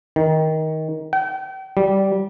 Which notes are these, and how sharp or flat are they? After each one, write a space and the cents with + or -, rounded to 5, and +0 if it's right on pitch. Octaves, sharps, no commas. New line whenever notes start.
D#3 +15
G5 -40
G3 -15